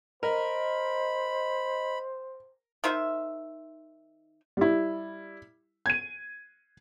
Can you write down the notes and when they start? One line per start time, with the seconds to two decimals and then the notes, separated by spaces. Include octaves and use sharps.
0.23 A#4 C5 D#5 B5
2.84 D#3 D#4 C5 E5
4.57 G3 E4
5.86 G#6 D#7